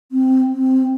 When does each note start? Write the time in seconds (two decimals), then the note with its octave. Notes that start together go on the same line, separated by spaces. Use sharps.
0.12 C4
0.54 C4